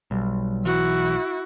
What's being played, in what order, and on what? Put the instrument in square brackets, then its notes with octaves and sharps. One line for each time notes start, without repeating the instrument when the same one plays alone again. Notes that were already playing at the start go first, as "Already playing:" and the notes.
[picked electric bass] B1 [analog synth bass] G3
[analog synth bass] E3 [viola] E4 F#4